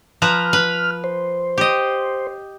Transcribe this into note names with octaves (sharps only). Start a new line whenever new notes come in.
F3 B4 A#5 F6
B4
C5
G4 D#5